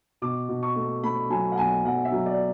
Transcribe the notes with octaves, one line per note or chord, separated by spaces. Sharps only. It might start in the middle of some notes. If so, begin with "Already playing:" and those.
B2 D6
B2
C#6
A3
A3 B5
F#3 G#5
F#5
B1 G#5
B1 F#5
E5
F#3
D5